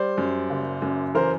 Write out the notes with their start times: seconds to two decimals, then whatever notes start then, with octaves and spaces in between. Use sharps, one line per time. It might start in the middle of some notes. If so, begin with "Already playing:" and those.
Already playing: G3 C5 D5
0.18 F#2
0.50 F#1
0.82 F#2
1.15 E3 A#4 C5